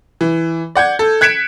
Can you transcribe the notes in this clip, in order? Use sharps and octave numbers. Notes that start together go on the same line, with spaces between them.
E3
D5 F#5 G6 G#6
A4
F#6 G#6 B6 C#7 D7 E7